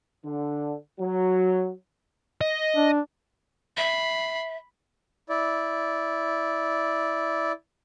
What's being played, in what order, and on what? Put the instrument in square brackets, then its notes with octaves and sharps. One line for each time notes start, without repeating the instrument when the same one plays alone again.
[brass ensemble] D3
F#3
[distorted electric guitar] D#5
[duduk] D4
[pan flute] E5 [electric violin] B5 C7
[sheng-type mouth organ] E4 D5